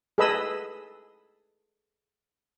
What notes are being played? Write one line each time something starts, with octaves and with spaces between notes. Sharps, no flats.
G#4 A4 B4 D#5 B5 E6